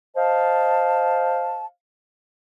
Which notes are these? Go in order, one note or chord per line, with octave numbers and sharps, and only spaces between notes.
C5 D#5 F5 A5